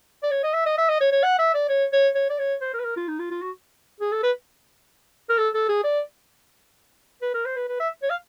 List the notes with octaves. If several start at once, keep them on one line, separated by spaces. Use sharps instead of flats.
D5
C#5
D#5
E5
D#5
E5
D#5
C#5
C#5
F#5
E5
D5
C#5
C#5
C#5
D5
C#5
C5
A#4
B4
A#4
F4
D#4
F4
F4
F#4
G#4
A4
B4
A#4
A4
A4
G#4
D5
B4
A#4
C5
B4
B4
E5
C#5
F5